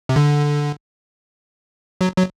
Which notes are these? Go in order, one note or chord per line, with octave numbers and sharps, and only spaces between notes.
C3
D3
F#3
F#3